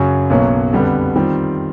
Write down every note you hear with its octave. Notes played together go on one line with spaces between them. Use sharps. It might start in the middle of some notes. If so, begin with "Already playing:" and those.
Already playing: F#2 C#3 F#3
B1 B2 F#3 A#3 C#4
F2 D3 G3 B3
D#3 G3 C4 F4